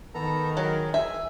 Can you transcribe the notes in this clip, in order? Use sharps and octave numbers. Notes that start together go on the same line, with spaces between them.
D#3 B3 A4 A#5
F#3 G#4 A#4
G#4 E5 G#5